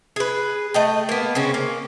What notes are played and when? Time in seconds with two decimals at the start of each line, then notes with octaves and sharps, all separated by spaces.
0.16 G#4 B4
0.74 A3 D#5 G5
1.09 A#3 B3
1.35 C#3 C4 C#4
1.54 A#3